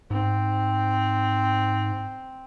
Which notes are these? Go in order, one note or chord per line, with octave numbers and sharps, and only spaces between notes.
G#2 C4